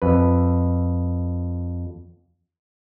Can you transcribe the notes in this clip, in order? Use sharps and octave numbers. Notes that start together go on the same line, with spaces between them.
F2 B4